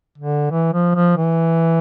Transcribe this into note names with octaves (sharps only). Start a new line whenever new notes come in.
D3
E3
F3
F3
E3